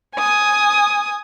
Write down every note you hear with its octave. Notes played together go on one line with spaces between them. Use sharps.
G#5 D#6